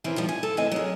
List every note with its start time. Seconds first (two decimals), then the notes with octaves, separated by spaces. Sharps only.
0.04 C#3 E3 C4 A#4 B4
0.16 D#3 F3 G3
0.29 G#5
0.43 A4
0.57 E2 A2 C#3 C4 D#5 G#5
0.71 F#3 G#4 A#4